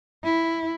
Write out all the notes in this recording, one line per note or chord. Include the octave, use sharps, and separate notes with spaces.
E4